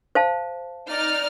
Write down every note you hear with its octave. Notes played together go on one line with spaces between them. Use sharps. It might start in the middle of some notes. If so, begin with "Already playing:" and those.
C5 F5 A5
D#4 D5 F6